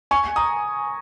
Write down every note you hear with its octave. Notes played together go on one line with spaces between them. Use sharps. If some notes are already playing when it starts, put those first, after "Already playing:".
G#5 C#6
A#5 D#6